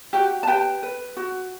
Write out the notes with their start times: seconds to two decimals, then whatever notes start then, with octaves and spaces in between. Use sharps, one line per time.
0.13 F#4 G4 G5
0.43 A5
0.47 G4 B4 G5
0.83 B4
1.17 F#4